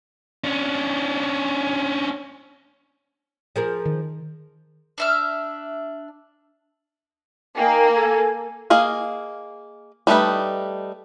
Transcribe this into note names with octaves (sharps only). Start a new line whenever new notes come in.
C#4 D4
F3 G#4 A#4
D#3
D4 E5 F6
A#3 D#4 G5 G#5
A4 G#5 G#6
A#3 G#4 D#5 F5
G3 A3 D#4 B4